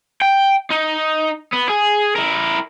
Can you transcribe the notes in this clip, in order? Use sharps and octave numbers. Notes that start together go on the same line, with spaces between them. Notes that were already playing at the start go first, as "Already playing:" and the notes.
G5
D#4
B3
G#4
E4 A#4